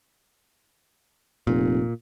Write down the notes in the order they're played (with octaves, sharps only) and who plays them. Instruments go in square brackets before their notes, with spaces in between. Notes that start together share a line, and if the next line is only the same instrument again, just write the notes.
[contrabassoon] F1 [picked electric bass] A#2